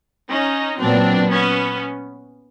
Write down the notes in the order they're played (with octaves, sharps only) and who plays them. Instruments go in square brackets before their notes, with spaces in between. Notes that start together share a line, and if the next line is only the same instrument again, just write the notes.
[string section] C#4 D#4
[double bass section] A#2 F#3 B3 [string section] C4 D4
[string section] B3 C#4